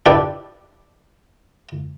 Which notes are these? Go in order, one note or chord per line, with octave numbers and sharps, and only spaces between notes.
D4 E4 G4 B4 D5